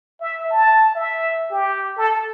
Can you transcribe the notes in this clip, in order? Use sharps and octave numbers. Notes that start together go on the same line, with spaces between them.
E5
A5
E5
G4
A4